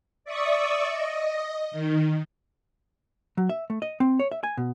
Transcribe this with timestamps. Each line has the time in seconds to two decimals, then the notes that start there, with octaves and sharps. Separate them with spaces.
0.24 D5 E5 C#6 D#6
0.90 D#5
1.71 D#3
3.37 F#3
3.49 E5
3.70 A3
3.82 D#5
4.00 C4
4.19 C#5
4.32 E5
4.43 G#5
4.57 B2